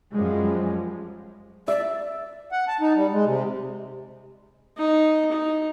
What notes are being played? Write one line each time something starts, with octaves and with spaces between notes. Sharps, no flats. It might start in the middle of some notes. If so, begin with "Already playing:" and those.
F#2 F3 G3 G#3
D5 E5
F#5
A5
D#4
G3
G#3
C3
D#4
D#4